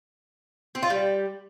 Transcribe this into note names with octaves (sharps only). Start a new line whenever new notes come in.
C4
F4
G3